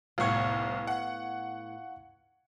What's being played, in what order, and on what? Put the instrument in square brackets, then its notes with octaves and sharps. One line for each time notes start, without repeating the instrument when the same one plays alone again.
[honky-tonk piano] F1 C2 G#6 [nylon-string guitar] A2 B3 [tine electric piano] F5 C#6
[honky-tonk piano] F#5